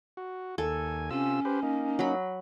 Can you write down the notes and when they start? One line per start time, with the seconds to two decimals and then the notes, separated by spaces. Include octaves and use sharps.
0.17 F#4
0.58 D#2 A4 G#5
1.11 C3 C#4 F4 E6
1.45 G4 B4 C5
1.63 A#3 D#4
1.99 F#3 B5